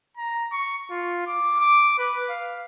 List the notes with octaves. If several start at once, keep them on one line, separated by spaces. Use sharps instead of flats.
A#5
C#6
F4
D6
D6
B4
F5